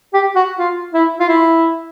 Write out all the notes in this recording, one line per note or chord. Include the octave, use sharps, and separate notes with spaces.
G4
F#4
F4
E4
F4
E4